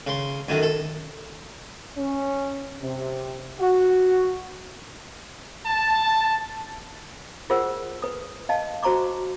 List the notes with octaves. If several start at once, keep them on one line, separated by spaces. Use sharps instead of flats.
C#3 C6
F#2 D3 D#3
A4
C#4
C3
F#4
A5
F4 G#4 A#4 C5 F#5 E6
B4 D#6
D#5 F5 A5
F#4 C5 A#5 C#6 D6